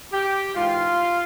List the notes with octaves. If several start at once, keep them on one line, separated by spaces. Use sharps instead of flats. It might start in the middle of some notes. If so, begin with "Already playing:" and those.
G4
G#2 E3 F4